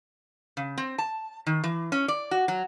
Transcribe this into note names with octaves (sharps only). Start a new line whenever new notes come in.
C#3
C4
A5
D#3
E3
C#4
D5
F#4
F#3